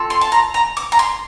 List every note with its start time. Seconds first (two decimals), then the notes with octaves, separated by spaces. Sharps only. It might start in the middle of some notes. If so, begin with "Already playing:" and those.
Already playing: C4 F4 A4
0.10 C6
0.21 A5
0.32 A#5
0.54 A#5
0.77 D6
0.92 A#5
0.99 C6